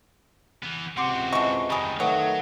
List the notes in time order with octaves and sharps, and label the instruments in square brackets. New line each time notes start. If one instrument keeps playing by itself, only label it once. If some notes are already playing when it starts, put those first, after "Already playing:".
[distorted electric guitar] E3 B3
[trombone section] C#2 C3 [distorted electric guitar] C4 F#4 [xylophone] F#5 C6 D6
[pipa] E3 C#6 [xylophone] D#5 A5
[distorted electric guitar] F2 D#3 [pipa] G3 G#4
[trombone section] D#3 A3 [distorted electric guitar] F#3 [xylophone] B4 F#5 D#6 [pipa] C#5